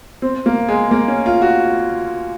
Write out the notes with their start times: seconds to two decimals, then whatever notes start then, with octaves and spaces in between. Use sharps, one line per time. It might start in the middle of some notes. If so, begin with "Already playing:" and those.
0.22 C4
0.46 A#3
0.68 G#3
0.91 A#3
1.08 C#4
1.26 F4
1.42 F#4